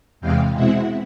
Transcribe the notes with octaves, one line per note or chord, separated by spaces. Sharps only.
E2 C3 E3 G#3 F5 G5
B2 G#3 C4 E4 E5 F#5